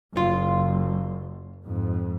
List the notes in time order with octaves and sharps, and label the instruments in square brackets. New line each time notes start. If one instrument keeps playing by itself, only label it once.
[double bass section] F#1 [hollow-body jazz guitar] F4
[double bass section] F2 G#2